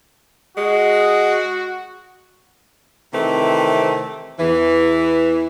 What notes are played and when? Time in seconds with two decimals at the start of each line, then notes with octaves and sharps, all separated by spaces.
0.57 G#3 F#4
3.14 C3 D#3 E3 A3 C4
4.39 E2 E3